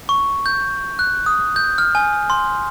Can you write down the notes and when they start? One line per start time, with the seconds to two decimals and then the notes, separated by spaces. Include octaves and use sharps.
0.09 C#6
0.46 G6
0.99 F#6
1.26 D#6
1.56 G6
1.78 F6
1.95 G#5
2.30 C6